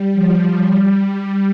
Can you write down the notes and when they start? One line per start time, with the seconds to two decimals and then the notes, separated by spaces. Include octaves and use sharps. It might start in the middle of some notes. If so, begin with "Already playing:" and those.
Already playing: G3
0.14 F3
0.68 G3